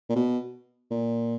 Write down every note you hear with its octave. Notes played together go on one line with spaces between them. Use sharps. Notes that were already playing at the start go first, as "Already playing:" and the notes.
A#2
B2
A#2